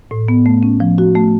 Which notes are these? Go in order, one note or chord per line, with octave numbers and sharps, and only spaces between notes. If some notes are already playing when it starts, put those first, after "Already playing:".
A2
B3
A3
C#4
F3
F#4
A3